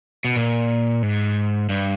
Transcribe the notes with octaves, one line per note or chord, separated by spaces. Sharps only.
B2
A#2
G#2
G2